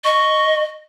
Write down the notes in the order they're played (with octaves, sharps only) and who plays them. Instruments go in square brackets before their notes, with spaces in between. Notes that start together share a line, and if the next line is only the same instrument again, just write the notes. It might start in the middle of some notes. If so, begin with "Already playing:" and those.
[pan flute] D#5 [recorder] C#6